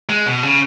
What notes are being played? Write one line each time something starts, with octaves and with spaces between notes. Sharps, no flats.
G#3
B2
C#3